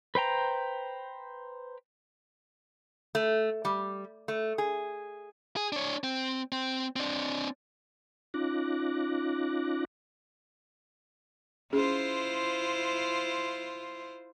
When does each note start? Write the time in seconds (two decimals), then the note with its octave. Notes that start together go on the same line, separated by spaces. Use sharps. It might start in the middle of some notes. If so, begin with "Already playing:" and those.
0.15 B4 C5 G5 A#5
3.15 A3
3.65 G3
4.28 A3
4.58 G#4
5.57 G#4
5.72 D4 C#5
6.04 C4
6.52 C4
6.96 C4 D4
8.34 C#4 D#4 F4 D6 F#6 A#6
11.73 C#4 E4 F4 G#4 C5